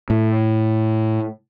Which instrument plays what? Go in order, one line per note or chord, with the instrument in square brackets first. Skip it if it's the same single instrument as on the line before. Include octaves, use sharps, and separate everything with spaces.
[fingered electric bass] A2